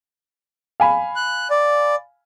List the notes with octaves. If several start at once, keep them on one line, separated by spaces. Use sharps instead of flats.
F5 G#5 B5
F#6
D5